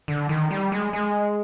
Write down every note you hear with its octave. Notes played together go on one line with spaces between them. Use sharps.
D3
D#3
G3
G#3
G#3